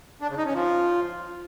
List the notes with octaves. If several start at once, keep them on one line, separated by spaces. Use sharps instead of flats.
D4
C#3
D#4
C#4
F3